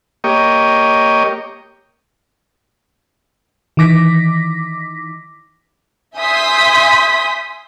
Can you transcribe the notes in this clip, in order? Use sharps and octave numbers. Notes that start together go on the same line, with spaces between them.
A#3 G4 C#5 D#5
D#3 E3 D6 A#6 B6
E5 G#5 C6 D#6 G6 B6